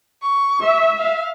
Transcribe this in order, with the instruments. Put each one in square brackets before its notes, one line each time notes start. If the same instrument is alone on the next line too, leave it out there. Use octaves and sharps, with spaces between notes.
[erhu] C#6
[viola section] E5
[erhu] F5